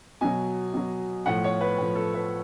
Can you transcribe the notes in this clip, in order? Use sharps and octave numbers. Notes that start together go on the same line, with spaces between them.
B2 F#3 G#5
B2 F#3
A2 F3 F#5
C#5
B4
A2 F3
A4
B4